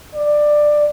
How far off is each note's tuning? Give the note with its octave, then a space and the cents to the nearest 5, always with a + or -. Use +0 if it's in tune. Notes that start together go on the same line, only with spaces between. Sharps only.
D5 +15